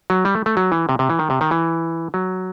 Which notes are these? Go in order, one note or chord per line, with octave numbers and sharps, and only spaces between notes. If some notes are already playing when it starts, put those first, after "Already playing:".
F#3
G3
A3
A3
F#3
E3
C3
C3
E3
D#3
C3
D#3
E3
F#3